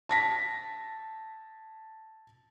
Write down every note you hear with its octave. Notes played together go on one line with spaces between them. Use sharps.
A5 A#6 B6